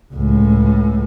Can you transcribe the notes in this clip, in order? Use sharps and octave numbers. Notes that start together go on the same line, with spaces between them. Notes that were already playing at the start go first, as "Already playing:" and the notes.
C#2 A2